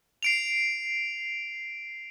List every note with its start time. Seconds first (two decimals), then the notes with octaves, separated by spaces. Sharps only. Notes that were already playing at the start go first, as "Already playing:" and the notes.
0.23 C7 D7 F7